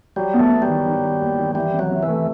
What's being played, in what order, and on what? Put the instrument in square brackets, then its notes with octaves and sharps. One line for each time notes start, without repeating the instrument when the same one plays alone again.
[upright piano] F#3 [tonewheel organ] G3
[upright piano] B3
[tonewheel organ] A3
[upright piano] B3
[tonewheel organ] G3
[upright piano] D#3
D#3
D#3
D#2
D#3
[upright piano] E3 [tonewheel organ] G3
[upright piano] C3
[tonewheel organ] F#3
[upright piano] C3
[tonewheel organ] E3
[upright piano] A3